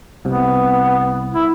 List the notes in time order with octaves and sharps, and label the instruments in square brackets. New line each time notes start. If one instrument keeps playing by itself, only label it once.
[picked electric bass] C2 C3 [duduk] B3
[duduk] E4